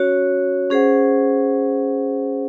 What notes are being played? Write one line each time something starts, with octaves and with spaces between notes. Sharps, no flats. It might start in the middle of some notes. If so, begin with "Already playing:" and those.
Already playing: C#4 F#4 C#5
C#4 G#4 C5 F#5